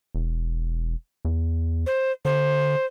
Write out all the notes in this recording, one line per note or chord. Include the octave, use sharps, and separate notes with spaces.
E1
E2
C5
D3 C5